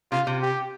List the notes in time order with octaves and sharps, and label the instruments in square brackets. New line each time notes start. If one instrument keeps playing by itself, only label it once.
[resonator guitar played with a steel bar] C3 [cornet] F4
[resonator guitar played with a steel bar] C3
[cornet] G4